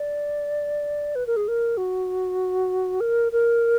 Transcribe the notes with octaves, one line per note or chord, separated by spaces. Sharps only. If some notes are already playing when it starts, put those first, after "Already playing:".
Already playing: D5
B4
A#4
G#4
A#4
F#4
A#4
A#4